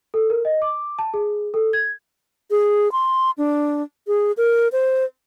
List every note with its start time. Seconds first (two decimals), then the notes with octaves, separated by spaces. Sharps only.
0.14 A4
0.30 A#4
0.45 D#5
0.62 D6
0.99 A5
1.14 G#4
1.54 A4
1.73 G#6
2.51 G#4
2.92 C6
3.38 D4
4.07 G#4
4.37 A#4
4.72 C5